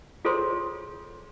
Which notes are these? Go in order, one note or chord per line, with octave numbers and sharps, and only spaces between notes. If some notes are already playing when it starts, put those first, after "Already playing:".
F4 G#4 A4 C5 C#5 C6